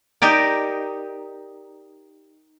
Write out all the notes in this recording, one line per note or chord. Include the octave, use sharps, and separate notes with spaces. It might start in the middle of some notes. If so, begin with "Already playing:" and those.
D#4 G4 A#4 D5